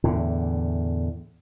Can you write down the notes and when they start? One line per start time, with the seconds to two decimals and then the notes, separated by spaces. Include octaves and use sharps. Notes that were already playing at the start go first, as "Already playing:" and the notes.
0.04 E2 A2 D3